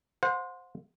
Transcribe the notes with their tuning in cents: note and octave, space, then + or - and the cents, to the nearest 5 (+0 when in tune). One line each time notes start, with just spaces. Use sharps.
C5 +0 F#5 -40